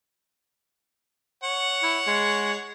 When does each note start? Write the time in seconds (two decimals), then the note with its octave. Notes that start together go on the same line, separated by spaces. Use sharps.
1.43 C#5 F#5
1.83 E4
2.07 G#3